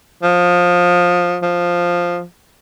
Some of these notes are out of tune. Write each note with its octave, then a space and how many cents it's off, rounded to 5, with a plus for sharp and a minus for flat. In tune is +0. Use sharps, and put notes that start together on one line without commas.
F3 +20
F3 +5